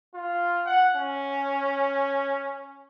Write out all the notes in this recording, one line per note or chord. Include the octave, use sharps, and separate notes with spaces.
F4
F#5
C#4